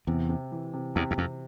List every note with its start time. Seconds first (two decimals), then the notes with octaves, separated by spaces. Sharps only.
0.07 E2 C3
0.29 C3
0.52 E3
0.74 C3
0.95 E2 C3
1.11 E2
1.18 F2 C3